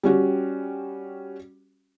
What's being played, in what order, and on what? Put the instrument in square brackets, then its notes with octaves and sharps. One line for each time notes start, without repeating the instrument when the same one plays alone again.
[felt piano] G3 C#4 F#4 G4